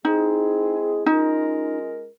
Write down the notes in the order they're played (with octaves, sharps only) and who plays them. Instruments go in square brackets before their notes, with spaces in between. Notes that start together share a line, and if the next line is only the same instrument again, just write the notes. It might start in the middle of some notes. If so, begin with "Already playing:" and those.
[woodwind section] G#3 C4 E4 G#4 [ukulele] D#4
[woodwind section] G#3 C#4 F4 A#4 [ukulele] D#4